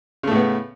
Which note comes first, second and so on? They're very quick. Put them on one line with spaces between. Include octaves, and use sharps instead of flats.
C#3 A3 A2 B3